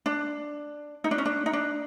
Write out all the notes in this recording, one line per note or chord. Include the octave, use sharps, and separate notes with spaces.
D4
D#4
D4
C#4
D4
D#4
D4